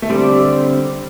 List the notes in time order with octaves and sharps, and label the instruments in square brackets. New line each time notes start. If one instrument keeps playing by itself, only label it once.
[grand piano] A3
[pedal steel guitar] D3 C4 G4 D5 [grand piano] G3